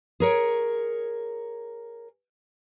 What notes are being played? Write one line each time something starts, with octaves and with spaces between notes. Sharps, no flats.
G#4 A#4 C#5